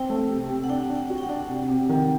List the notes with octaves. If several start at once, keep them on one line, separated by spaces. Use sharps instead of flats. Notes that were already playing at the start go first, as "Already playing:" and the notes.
Already playing: C4 G5
A3
C3
C3
F#5
D4 G5
D4
G5
F#4
G5
F#5
D4
C3
C3
D#3